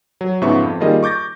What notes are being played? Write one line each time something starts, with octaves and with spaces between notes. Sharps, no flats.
F#3
G#2 C#3 F3 B3 E5 C#6
F2
D#3 G3 A#3 F4 G#4 D#5
C#6 D6 G6 A6 A#6